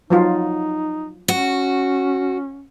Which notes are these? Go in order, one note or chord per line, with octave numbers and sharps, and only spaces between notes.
F3 F#3 D#4 F4
C#4 F#4